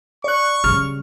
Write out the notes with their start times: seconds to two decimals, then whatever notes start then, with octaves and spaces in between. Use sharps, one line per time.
0.24 D5 C#6 F#6
0.64 C#3 G3 F6